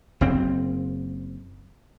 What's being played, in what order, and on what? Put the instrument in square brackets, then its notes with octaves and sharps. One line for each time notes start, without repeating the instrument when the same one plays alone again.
[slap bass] F#1 C4